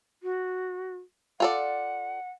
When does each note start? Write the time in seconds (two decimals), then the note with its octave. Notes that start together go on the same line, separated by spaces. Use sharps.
0.23 F#4
1.40 F4 A4 D5 F#5